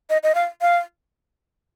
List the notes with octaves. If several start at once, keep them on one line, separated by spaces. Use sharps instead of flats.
D#5
D#5
F5
F5